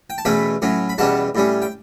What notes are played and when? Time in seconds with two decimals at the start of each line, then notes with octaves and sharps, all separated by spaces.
0.10 G5
0.18 A5
0.25 E2 B2 A3 C#4 G5 B5
0.62 A2 F#3 C#4
0.89 B5
0.98 E2 B2 G3 C#4 F#5 A5
1.35 A2 G3 C#4
1.62 G5